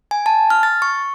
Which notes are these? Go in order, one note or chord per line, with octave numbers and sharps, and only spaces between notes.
G#5
A5
F6
A6
C#6